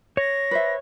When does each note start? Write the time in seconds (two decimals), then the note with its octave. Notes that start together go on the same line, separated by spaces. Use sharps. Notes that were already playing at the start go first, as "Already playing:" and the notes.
0.17 C#5 A#6
0.51 B4 C5 E5